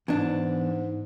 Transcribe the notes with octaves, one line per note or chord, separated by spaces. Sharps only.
E2 G#2 D4